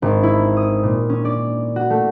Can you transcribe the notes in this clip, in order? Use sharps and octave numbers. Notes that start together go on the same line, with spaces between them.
G#1
E4
D#6
A#2
C#4
D5
F#4
A3